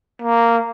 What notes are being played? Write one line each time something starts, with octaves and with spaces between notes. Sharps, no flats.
A#3